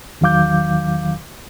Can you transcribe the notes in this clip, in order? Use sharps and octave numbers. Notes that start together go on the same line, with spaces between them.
E2 D#3 F#3 F5 D6 G6